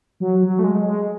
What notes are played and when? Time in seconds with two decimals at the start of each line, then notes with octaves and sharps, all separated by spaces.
0.20 F#3
0.42 F#3
0.59 A3
0.64 G#3
0.86 G#3